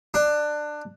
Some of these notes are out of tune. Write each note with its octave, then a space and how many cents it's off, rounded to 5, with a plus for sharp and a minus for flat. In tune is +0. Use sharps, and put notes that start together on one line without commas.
D4 +20